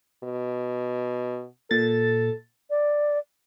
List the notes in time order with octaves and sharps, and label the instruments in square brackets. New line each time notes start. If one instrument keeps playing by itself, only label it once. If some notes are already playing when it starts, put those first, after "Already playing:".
[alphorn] B2
[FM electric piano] A#2 A6 [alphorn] A4
[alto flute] D5